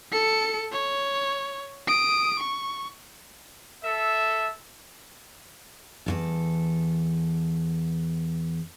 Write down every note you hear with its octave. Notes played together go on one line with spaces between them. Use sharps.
A4 C#7
C#5
D#6 D7
C#6
A4 E5
E2 G2 A4